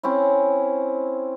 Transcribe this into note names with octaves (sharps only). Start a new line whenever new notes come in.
C4 C#4 E4